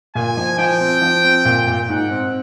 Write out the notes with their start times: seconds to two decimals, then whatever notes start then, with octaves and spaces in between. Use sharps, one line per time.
0.15 A#2 G#5
0.37 F3
0.58 F3 G5
0.81 C4
1.02 F3
1.24 C4
1.45 A#2
1.67 A#2
1.89 G#2 F#5
2.11 C4